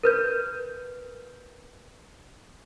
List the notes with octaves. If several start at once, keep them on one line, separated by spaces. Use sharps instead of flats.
A#4 B4 G6